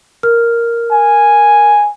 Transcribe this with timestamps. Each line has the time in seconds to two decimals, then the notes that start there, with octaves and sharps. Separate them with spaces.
0.23 A#4 F6
0.92 G#5